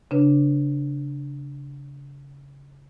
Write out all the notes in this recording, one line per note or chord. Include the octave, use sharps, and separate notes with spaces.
C#3 D4 B4